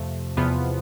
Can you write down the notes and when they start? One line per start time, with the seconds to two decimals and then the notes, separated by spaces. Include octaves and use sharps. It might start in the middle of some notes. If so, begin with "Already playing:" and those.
Already playing: F2 C3 F3 A3
0.37 E2 C3 F3 B3 F4